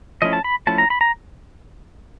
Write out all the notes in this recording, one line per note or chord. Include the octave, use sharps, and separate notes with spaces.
F3 A3 C#4 E4 D#5
A5
B5
F3 A3 C#4 E4 A5
A#5
B5
A#5